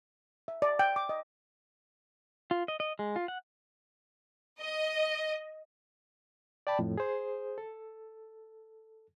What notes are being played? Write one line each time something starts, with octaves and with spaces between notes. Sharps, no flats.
E5
D5
G5
D6
D#5
F4
D#5
D#5
G#3
F4
F#5
D#5
D5 G5 A5 B5
F2 A2
G#4 C5
A4